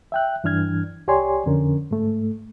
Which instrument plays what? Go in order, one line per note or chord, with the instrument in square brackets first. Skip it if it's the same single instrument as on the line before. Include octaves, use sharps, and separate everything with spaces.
[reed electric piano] E5 G5 F#6
G2 E3 D4 F6 G#6
C2 G4 C#5 D5 G#5 C6
F2 D3 C#4 A#4
G#2 A3